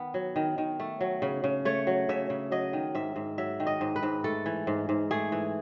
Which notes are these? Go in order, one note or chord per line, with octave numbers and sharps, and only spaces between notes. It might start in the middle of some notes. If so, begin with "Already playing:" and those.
Already playing: D#3 B3
F#3
D#3
D#3
A3
F#3
C#3
C#3
A3 C#5
F#3
C#3 E5
C#3
F#3 D#5
D#3
G#2 E5
G#2
F#3 E5
D#3
D#5
G#2
B4
G#2
A3 A4
E3
G#2
G#2
A3 G#4
E3